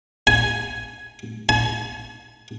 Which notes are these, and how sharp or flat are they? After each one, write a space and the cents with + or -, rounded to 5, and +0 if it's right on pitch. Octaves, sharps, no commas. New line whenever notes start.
G#5 +10
G#5 +45